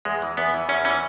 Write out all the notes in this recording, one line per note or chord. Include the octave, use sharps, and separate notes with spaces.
E2 G#3
E3
E2 B3
E3
E2 C#4
E3 C#4